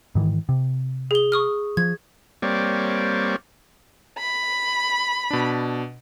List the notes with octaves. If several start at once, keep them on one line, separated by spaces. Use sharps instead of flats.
G#2 D#3 E3
C3
G#4 G7
C#6 D#6 F6
F3 G#6
G3 A#3 C4 C#5 D5
B5
B2 D4